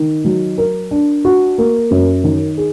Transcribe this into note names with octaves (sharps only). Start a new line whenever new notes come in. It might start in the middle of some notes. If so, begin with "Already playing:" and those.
Already playing: D#3
F#3
A#4
D4
F#4
A#3
F#2
D#3
G#4